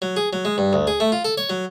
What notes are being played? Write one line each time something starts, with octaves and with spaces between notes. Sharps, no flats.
F#3
G#4
F#3
G#3
G2
D2
G#4
A3
F4
A4
C#5
F#3